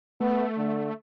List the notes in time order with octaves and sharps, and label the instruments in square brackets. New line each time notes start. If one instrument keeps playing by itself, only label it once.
[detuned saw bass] A3 [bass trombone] B3
[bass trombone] D3